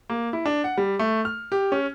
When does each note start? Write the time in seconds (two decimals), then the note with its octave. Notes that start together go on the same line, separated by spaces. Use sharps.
0.10 A#3
0.33 E4
0.46 D4
0.64 F#5
0.78 G3
0.99 A3
1.25 F6
1.52 G4
1.72 C#4